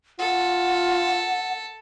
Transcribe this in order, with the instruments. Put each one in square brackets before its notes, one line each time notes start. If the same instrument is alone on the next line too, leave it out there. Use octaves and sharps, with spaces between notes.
[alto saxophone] F4 [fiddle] A4 [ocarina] F#5